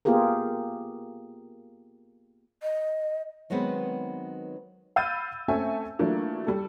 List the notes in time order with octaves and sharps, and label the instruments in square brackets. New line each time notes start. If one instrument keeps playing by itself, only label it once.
[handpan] A#3 B3 F4 G4 G#4 A#4
[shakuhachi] D#5
[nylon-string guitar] D#3 F#3 G#3 B3 C4 B4
[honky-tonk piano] F5 B5 E6 G6 A6 D#7
A3 C4 C#4 A4 E5 G#5
E3 F#3 A3 A#3 D4 F4
G3 A4